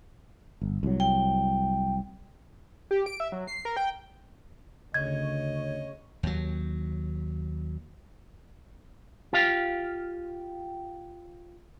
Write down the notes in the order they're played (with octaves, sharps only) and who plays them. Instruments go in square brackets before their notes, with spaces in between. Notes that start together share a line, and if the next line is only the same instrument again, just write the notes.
[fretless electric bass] G1
C2 F#3
[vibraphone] G5
[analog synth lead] G4
D7
E5
F#3
C7
A#4
G5
[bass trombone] D2 [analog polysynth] C#3 C#5 [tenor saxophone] D#5 [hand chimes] G#6
[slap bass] D#2 F#3
[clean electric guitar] F4 G4 F5